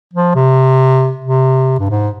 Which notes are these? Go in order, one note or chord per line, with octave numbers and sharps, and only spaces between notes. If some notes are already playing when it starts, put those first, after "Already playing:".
F3
C3
C3
G2
G#2